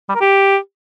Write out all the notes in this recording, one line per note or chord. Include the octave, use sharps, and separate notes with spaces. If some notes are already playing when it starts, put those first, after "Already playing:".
G3
A#4
G4